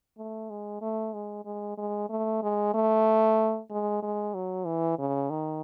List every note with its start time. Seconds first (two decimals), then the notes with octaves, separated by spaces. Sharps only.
0.18 A3
0.50 G#3
0.81 A3
1.14 G#3
1.45 G#3
1.78 G#3
2.10 A3
2.43 G#3
2.74 A3
3.71 G#3
4.02 G#3
4.34 F#3
4.66 E3
4.99 C#3
5.30 D#3